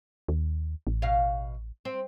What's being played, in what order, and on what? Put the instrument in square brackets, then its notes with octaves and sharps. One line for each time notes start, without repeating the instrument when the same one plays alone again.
[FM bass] D#2
A1
[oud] B2 F5
C4